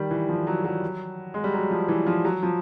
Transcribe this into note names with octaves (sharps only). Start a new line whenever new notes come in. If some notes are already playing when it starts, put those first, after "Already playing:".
Already playing: D#3 G3
E3
F3
F#3
F#3
G#3
G3
F#3
F3
E3
F3
F#3
F3